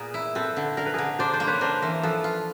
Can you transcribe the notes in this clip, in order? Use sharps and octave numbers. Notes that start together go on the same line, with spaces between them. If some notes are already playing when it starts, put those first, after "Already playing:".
Already playing: A#2 B3 G#4 A#4
E4
C4 A4 B4
D3
D3 A#4
B4
D3 G#4 A#4
D4 C5 D5
C5 D5
A#3
B4 C#5
D4 A#4 C5
E3 A#4 C5
F3 A4 B4
F4